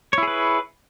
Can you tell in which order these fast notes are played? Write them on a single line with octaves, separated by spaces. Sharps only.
C#5 E4 G#4 B4